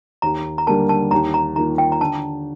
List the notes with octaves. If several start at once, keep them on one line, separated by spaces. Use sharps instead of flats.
D#2 A#5
A#5
D3 G3 A#3 A5
A5
D#2 A#5
A#5
D#3 A#3 F4 A#5
G5
A#5
D3 A5